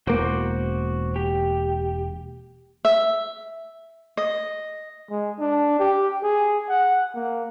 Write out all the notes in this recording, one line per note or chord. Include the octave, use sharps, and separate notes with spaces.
E1 A#3 F#4 C5 D6
G4
E5
D#5
G#3
D4
G4
G#4
F#5
A#3